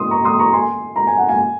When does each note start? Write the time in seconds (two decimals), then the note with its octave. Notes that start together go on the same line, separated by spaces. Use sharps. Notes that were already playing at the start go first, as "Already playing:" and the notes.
Already playing: C6 D#6
0.11 A#5 C#6
0.25 C6 D#6
0.39 A#5 C#6
0.53 G#5 C6
0.96 A#5
1.07 G#5
1.18 F#5
1.29 F5 G#5